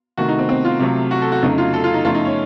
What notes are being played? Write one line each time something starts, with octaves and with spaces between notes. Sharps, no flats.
C3 D#3 A3 F#4
D#4
C4
C4
F4
C3 F#3 A3
F#4
A4
F#4
F2 C#3 F#3 A3 D#4
F4
A4
F4
D#4
F#2 C#3 F3 A3 F4
D#4
C#4